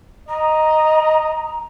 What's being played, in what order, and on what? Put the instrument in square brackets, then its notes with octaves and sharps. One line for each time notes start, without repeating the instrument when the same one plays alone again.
[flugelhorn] D#5 [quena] A#5